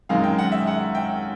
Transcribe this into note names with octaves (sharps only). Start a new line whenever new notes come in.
F#2 D#3 G#3 F5
G5
F#5
E5
F#5
G5